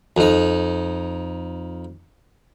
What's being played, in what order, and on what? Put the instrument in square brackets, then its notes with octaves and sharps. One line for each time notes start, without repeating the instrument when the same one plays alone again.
[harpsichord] F2 D#4